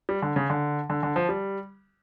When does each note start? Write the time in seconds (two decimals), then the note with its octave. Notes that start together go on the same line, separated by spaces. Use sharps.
0.09 G3
0.22 D3
0.36 C#3
0.50 D3
0.90 D3
1.03 D3
1.16 F3
1.29 G3